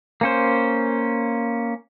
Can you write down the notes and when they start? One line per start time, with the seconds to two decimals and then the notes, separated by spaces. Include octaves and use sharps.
0.21 A#3 C#4 C5